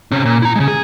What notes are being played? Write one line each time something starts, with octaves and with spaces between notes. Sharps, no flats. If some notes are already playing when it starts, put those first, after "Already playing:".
C3 C#4
A#2
E4 A#5
C#3 G#3
G#4